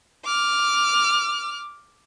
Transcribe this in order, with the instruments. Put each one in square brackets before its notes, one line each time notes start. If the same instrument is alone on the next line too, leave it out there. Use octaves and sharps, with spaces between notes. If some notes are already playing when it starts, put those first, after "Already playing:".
[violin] D6 F6